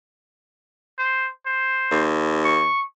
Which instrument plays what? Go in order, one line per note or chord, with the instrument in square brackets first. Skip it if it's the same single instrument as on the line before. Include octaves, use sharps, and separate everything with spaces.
[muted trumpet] C5
C5
[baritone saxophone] D#2
[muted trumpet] C#6